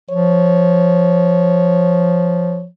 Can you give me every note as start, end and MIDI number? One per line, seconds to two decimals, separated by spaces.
0.10 2.67 53
0.10 2.64 73